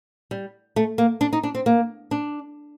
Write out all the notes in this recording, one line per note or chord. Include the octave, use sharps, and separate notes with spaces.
G3
A3
A#3
D4
D#4
D4
C4
A#3
D4